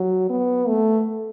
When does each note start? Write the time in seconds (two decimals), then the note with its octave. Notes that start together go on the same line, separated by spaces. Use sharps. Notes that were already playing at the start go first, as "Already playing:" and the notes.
Already playing: F#3
0.30 B3
0.68 A3